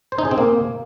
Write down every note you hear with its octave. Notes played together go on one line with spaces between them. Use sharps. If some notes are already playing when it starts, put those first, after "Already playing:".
C5
D#4
G#4
C4
A#3